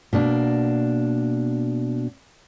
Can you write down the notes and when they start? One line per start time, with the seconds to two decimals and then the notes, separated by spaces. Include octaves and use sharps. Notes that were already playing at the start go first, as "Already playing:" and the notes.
0.13 B2 A#3 D4